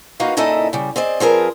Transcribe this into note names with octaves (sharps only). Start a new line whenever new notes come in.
A#3 D#4 F#4 B4 F5
A#2 C#3 D#4 E4 A4 D#5
C#3 G3
C4 G#4 D5 D#5
F3 C4 G#4 A#4 B4